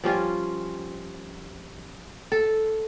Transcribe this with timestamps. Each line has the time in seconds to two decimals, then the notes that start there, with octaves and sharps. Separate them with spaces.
0.04 F3 G3 C#4 F4
2.32 A4